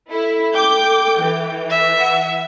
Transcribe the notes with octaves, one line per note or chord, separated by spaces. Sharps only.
E4 A4
G5 D6 G6
E3
E5
F#5